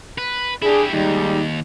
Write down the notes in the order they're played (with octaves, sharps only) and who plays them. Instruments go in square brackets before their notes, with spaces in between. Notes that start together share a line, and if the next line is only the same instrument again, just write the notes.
[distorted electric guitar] B4
[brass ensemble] D4 G#4 [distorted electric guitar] E4 G4
[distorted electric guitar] D#2 [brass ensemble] G3 G#3 D#4